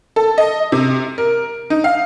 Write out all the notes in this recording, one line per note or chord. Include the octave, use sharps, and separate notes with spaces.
A4
D#5
C3
A#4
D#4
F5